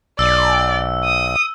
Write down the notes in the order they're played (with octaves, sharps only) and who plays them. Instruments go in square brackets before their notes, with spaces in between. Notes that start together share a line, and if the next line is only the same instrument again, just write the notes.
[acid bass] B1 [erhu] D5 [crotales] E6
[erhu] D#6